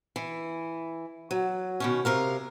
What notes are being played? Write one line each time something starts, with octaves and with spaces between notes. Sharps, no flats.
E3
F#3
B2 D#3 C#4
C3 A#4 F5